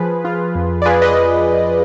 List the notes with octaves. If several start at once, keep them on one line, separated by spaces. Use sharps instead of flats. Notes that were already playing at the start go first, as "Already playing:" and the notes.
Already playing: F3 G#4 B4
F4
F2
D5
F4 G#4 B4
B4 D#5